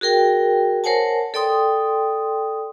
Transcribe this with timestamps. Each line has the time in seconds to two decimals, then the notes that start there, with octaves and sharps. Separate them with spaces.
0.01 F#4 G#4 A#4 G5
0.84 A#4 C5 C#5 F#5 G#5 A5
1.34 A4 D5 G5 C6 D#6